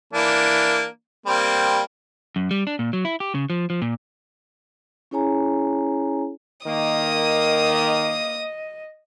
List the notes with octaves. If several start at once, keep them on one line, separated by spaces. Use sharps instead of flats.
E3 A#3 D4
G3 A#3 C4
F#2
G3
D4
A#2
F#3
E4
G4
C#3
F3
F3
A#2
C#4 E4 G#4 C#5 G#5 A#5
D#3 A#3 D#5 D#6